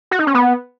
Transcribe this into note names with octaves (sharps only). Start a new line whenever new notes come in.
F#4
D#4
C#4
B3